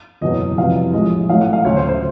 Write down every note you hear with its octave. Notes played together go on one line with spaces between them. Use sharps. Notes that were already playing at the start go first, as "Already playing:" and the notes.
F#1 E2 B2 F#3 D#5
F2 C3 E3 G3 F5
A#1 A2 F3 G#3 D#5
A1 A2 F#3 A3 F5
F#5
F5
D2 C#3 F#3 C#5
C5
C5